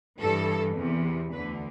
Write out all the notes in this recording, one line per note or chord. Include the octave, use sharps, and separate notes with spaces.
G2 E3 A4
E2 C3 E3
D2 D3 B4